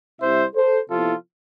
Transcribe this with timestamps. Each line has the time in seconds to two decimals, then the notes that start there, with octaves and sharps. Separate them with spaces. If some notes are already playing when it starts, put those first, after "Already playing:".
0.20 C3 G3 C4 E4 C5 E5
0.55 A4 C5
0.90 C3 F3 B3 E4 F4 A4